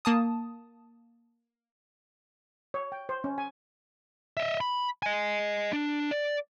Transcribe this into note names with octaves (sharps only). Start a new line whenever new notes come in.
A#3 A5 D#6
C#5
G5
C5
C#4
G#5
D#5 E5
B5
D#5 G#5
D4
D5